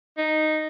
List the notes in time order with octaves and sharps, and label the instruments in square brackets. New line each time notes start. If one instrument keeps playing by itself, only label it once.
[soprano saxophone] D#4